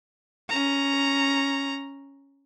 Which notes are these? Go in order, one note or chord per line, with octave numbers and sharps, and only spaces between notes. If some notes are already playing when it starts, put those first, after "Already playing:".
C#4 A#5